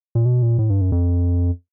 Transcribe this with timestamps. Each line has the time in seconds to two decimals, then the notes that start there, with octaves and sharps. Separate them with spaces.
0.15 A#2
0.26 B2
0.42 A#2
0.58 A2
0.70 G2
0.81 F#2
0.92 F2